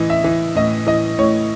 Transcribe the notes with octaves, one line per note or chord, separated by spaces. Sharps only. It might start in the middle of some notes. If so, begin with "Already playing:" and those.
Already playing: A2 E3 D#5
E5
E3
A2 D#5
E3 D#5
A2 C#5